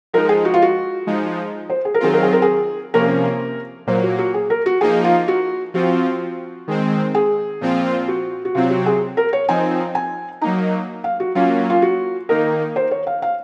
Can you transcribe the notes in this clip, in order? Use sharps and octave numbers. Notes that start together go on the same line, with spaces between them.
F3 G#3 D#4 A#4
G#4
F#4
F4
F#4
F3 G#3 D#4
C5
G#4
A#4
D#3 F#3 C4 F4 G#4
A#4
G#4
A#4
G#4
C3 F3 A#3 C#4 A#4
A#2 F#3 A#3 C5
F#4
F#4
G#4
A#4
F#4
F3 A#3 D#4 G#4
F4
F#4
F3 C4 F4 F#4
D#3 G#3 C4
G#4
A#2 F3 C4 F4
F#4
F#4
C3 F#3 C4 F4
F#4
G#4
A#4
C#5
F3 C4 D#4 G#5
G#5
F#3 A#3 D#4 A#5
F5
F#4
F#3 A#3 C#4 F4
F4
F#4
D#3 A#3 D#4 A#4
C5
C#5
F5
F5